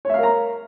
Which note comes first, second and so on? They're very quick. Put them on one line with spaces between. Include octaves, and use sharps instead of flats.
C#5 E5 F5 A#4 A#5